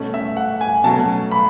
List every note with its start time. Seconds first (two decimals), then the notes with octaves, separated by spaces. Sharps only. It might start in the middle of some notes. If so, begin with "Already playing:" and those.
Already playing: B2 A3 C#4
0.14 E5
0.37 F#5
0.61 G#5
0.84 B2 F#3 A3 C#4 A5
1.32 B5